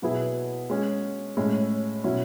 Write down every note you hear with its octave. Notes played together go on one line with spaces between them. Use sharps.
B2 F#3 B3 E4 G#4
G#3 C#4 G#4
A2 G#3 C#4
B2 F#3 C#4 E4